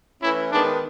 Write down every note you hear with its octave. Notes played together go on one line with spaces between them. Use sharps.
E3 A3 C#4 E4
D#3 G#3 B3 D4